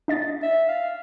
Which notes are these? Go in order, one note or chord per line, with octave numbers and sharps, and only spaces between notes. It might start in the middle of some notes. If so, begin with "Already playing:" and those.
D4 D#5 A6
E5
F5